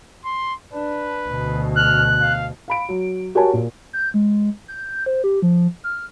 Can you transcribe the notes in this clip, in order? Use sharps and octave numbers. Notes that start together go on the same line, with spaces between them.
C6
D4 B4
D2 B2
F6 F#6
F5
F5 B5 D7
F#3
F#4 G4 A#4 C#5 G#5 A5
A#2
G6
G#3
G6
C5
G4
F3
F6